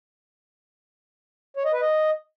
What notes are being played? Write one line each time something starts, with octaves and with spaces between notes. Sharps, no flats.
C#5
D#5
B4
D#5